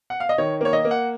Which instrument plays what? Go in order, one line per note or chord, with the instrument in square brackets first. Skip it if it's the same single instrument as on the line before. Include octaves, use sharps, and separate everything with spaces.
[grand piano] F#5
F5
D#5
D#3 C#5
A#3 C#5
D#5
A#3
F#5